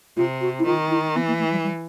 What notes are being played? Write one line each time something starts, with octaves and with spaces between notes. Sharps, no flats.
C3 F4
F#4
E4
D#3 F4
E4
E3 B3
A#3
A3
G3
G3